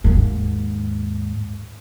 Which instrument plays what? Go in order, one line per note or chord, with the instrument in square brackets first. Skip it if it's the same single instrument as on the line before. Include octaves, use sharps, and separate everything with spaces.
[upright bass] D#2 G#2